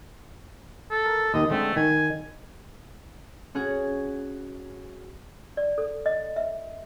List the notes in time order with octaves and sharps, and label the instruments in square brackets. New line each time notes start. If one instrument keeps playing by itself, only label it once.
[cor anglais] A4
[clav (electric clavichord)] A#4
[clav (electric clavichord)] D#2 D#3 [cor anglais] D#5
[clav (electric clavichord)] D3 G#3 C4 [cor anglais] A3
[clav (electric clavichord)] D#3 [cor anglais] G#5
[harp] C#4 F#4 G#4
[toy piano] D5
A4
D#5
E5